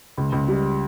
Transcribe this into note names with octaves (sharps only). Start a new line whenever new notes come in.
C#2
C#2
G3